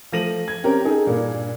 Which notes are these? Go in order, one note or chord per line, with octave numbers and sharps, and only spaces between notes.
F3 A3 A#6 D#7 F#7
G#6
C4 C#4 G4 A#4
D#4 G#4 A4
G2 A#2